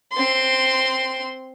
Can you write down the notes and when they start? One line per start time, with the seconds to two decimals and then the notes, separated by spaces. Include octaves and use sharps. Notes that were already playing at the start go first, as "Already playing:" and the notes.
0.13 C4 C6